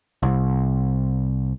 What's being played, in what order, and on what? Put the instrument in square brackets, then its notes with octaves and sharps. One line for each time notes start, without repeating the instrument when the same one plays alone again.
[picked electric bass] C2